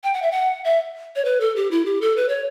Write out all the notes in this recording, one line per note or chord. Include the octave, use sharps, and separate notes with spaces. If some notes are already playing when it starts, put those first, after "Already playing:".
G5
F#5
E5
F#5
E5
C#5
B4
A4
G4
E4
G4
A4
B4
C#5